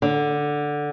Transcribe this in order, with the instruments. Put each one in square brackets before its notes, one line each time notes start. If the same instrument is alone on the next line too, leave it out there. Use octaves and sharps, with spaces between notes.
[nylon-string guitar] D3